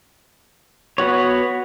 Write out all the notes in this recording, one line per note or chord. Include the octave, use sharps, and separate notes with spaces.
B3 F#4 C#5